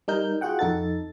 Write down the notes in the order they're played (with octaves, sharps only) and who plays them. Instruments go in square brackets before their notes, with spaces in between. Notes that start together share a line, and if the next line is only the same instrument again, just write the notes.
[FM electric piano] G3 D#4 A#4 G6
F4 F#4 G#4 F#5 G5
F2 D#4 A4 A6